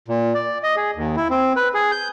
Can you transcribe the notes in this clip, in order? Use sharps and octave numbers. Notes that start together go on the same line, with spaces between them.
A#2
D5
D#5
G#4
D#2
E4
C4
B4
G#4
G6